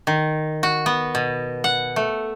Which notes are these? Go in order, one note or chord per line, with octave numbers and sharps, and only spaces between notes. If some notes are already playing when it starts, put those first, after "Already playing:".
D#3
F#4
B3
B2
F#5
A3